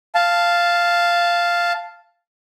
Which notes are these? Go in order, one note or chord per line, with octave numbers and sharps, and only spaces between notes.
F5 A5